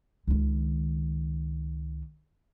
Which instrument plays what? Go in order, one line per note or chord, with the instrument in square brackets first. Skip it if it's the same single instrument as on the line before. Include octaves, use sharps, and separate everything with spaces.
[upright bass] C#2 D#3